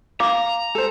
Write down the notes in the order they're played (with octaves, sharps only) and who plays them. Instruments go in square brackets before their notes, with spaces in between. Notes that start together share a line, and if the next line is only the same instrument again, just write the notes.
[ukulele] F5 [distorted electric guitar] A#5 [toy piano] D6
[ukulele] A4 C5